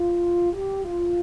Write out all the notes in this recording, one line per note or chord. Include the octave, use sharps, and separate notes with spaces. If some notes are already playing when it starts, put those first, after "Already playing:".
Already playing: F4
G4
F4